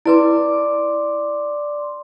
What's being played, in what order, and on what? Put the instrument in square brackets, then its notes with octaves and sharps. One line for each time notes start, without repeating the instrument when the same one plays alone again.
[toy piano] E4 B4 [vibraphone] D5 C6 D6